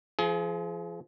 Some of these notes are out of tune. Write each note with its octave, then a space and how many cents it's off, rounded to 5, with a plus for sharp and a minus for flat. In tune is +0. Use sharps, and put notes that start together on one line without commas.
F3 -25 G#4 +30